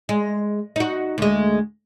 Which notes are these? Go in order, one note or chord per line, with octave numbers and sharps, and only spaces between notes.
G#3
D#4 F#4
D2 G#3